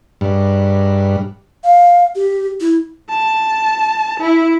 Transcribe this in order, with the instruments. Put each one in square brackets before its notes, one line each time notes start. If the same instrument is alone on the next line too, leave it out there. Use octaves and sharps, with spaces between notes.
[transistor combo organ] G2
[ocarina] F5
G4
E4
[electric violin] A5
E4